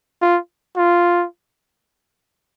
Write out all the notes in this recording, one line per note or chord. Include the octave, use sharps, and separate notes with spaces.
F4
F4